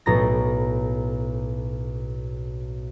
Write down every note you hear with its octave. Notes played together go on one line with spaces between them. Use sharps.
B1 A2 A#5 A6 A#6